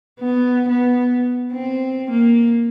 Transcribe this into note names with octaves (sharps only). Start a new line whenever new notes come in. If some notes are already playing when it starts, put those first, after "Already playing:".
B3
B3
C4
A#3